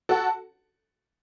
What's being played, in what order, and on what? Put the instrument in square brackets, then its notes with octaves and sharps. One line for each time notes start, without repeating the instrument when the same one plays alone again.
[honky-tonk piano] F#4 A4